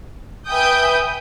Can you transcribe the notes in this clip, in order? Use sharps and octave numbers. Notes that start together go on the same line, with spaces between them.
B4 E5 G5 G#5 D#6 G6